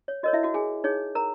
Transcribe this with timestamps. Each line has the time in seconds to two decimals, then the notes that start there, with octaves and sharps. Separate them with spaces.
0.08 C#5
0.23 F#4 A#4 C#5 D#5
0.33 E4 E5
0.43 F#4 F#5
0.54 G#4 G#5
0.84 D#4 G#4 C#5
1.15 A#4 A#5